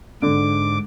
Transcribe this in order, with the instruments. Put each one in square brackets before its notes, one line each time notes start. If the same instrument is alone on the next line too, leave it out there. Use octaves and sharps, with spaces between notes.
[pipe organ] G#2 D6 [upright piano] D3